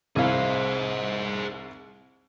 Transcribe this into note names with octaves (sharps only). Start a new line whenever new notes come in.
C2 E4 G#4 C5 F5